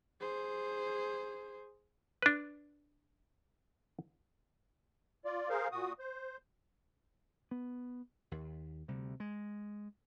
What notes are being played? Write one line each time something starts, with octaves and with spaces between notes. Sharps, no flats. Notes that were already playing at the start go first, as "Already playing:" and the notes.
G#4 C5
D4 B4
F4 D5
G#4 A#4 C5 F5
A#2 F#4 D#6
C5
B3
D#2
D2 C3 G3
G#3